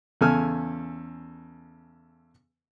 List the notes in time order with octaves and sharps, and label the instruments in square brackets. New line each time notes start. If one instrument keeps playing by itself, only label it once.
[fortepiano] E2 C#3 A4 G#5 E6 F6